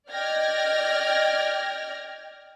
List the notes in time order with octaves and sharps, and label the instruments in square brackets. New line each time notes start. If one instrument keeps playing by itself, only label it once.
[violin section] D5 D#5 G5 F6 G#6 A#6